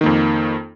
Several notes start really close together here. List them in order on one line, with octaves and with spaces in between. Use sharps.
D#3 A#3 F2